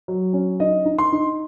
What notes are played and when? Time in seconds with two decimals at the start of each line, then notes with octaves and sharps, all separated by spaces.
0.08 F#3
0.33 C#4
0.60 D#4 D#5
0.85 D#4
0.98 C6
1.12 D#4